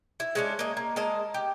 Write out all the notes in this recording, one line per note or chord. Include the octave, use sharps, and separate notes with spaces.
E4
G#3 C#4 D4
A#3 D#5
A#3
G#3 A#4 D#5 A5
G4